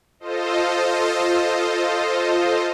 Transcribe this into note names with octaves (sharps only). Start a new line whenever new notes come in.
F4 A4 C5 D#5